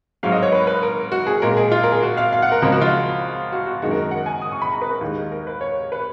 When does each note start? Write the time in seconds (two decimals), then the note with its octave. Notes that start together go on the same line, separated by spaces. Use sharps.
0.23 G#2 F#3 F5
0.32 D#5
0.42 C#5
0.52 B4
0.67 B4
0.83 A#4
1.12 F#4
1.27 G#4
1.42 A#2 G#3 A#4
1.57 G#4
1.72 F4
1.83 A#4
1.92 G#4
2.03 F#4
2.17 F5
2.33 F5
2.42 F#5
2.52 A#4
2.62 C#2 C#3 F3 G#3 A#4
2.72 F#4
2.81 F4
3.52 F#4
3.67 F#4
3.82 F#2 D#3 G#3 F#4
3.91 A#4
4.02 A#4
4.11 F#5
4.26 G#5
4.42 D#6
4.52 C#6
4.62 B5
4.72 A#5
4.81 B4
4.91 A#4
5.01 D#2 D#3 G#3
5.31 A#4
5.47 B4
5.61 C#5
5.92 B4